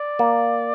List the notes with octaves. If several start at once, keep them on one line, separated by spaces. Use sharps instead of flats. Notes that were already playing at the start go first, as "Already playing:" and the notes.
Already playing: D5
A#3